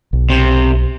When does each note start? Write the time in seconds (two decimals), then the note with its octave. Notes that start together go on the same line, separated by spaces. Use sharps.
0.13 B1
0.30 C3